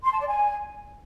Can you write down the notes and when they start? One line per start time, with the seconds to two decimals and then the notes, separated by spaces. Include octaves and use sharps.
0.03 C6
0.11 A5
0.19 D5
0.27 G#5